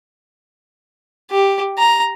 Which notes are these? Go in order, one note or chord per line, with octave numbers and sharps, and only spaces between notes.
G4
A#5